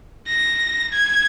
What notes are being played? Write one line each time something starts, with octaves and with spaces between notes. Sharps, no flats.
A#6
G#6